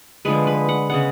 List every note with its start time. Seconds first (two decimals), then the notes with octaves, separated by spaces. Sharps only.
0.25 D3 F3 G#3 B4
0.47 B4
0.69 F#5
0.90 C#3 G#3 B3 F#5